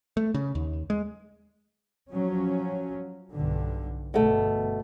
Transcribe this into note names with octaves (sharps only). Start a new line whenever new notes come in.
A3
C#3
D#2
G#3
F3 F#3 C#4
B1 G2 D3
G1 B2 A3